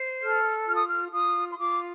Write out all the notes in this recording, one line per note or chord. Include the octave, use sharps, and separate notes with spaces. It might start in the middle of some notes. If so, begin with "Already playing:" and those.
Already playing: C5
A4 F6
F4 F6
D#6
F6
F4 D#6
C6
F4 D6